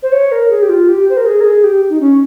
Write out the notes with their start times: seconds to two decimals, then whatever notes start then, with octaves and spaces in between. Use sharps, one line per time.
0.02 C5
0.12 C#5
0.32 A#4
0.50 G#4
0.62 G4
0.69 F4
0.88 G4
1.10 C5
1.17 A#4
1.26 G#4
1.40 A#4
1.44 G#4
1.64 G4
1.90 D#4
2.00 C#4